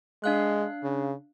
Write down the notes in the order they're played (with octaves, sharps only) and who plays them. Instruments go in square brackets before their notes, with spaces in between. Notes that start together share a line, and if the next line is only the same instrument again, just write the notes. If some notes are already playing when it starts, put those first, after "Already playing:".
[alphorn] G#3 [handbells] D4 F5 F#6
[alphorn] C#3